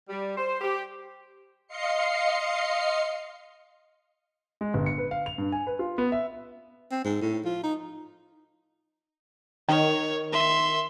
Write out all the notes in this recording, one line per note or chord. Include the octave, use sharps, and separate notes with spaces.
G3
C5
G4
D#5 F5 C6 C7 C#7
G#3
G1
C#7
B4
F5
F7
G2
G#5
B4
F4
B3
E5
C4
G#2
A2
F3
D#4
D#3 C#5
E5 C6